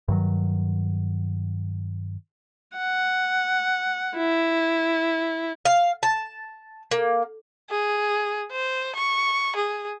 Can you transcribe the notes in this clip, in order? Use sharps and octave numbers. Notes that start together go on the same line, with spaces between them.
G2 D#3 F#3
F#5
E4
F5
A5
A#3
G#4
C5
C#6
G#4